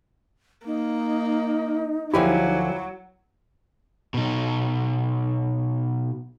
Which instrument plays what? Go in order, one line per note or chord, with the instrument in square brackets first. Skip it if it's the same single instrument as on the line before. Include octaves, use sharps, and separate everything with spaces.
[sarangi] A#3 [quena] D#4
[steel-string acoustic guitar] D2 F3 G#5 [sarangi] F#3 [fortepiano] E4 G4
[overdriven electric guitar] B2 D#4